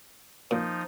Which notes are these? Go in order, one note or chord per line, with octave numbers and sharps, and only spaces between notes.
A#2 F3 D#4